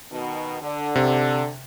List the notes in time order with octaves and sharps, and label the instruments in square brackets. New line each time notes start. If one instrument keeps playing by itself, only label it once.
[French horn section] B2 D#3
D3
[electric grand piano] C3